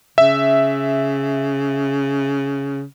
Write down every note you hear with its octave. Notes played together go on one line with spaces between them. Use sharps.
C#3 E5